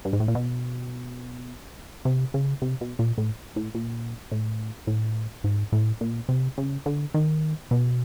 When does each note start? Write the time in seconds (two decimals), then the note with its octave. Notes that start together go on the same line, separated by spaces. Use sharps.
0.05 G2
0.13 G#2
0.20 A2
0.28 A#2
0.35 B2
2.05 C3
2.34 C#3
2.62 C3
2.81 B2
2.99 A#2
3.18 A2
3.56 A2
3.75 A#2
4.32 A2
4.87 A2
5.44 G#2
5.72 A2
6.01 A#2
6.29 C3
6.58 C#3
6.86 D3
7.14 D#3
7.71 B2